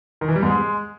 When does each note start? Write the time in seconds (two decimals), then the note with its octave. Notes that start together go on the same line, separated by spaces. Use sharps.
0.21 D#3
0.28 E3
0.36 G3
0.43 G#2
0.50 G#3